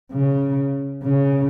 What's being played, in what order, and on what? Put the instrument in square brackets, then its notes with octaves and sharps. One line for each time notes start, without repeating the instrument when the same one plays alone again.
[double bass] C#3
C#3